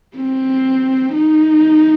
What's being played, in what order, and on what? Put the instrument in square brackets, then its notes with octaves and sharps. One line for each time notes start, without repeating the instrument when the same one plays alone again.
[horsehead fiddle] C4
D#4